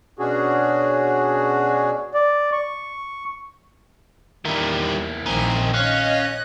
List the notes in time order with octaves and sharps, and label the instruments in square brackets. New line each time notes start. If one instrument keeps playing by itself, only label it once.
[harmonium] B2 C#4 D4 F#4 G#4
[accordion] D5
C#6
[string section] E2 [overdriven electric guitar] D#3 G3 [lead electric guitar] A#3 E4
[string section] A#1 D#3 [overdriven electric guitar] C4 D#4 [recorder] G#5
[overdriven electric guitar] C#4 [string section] C#5 D#5 [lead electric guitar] F5 [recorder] F#6